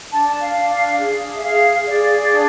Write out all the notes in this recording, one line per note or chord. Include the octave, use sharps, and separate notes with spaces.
D4 A5
F5
D4
F5
G#4
E5
G#4 F5
G#4 D5
D4